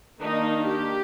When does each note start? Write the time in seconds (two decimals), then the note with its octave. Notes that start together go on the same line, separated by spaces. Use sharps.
0.20 D#3 A#3 D4 D#4
0.65 G4